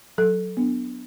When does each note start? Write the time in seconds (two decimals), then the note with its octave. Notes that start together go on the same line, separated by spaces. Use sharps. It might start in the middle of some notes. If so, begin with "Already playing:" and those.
0.18 F#3 A4
0.57 B3 D4